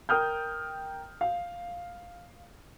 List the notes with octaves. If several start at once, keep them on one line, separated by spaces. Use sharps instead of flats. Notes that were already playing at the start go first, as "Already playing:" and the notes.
A#4 G5 D#6 F6 G6
F5